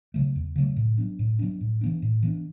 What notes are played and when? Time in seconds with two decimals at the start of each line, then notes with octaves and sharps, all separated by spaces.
0.14 C#3 F#3 A3
0.36 E2
0.56 C#3 F#3 A3
0.76 A2
0.98 F#3 B3 D4
1.19 A2
1.39 F#3 B3 D4
1.61 A2
1.81 E3 B3 D4
2.02 A2
2.23 E3 B3 D4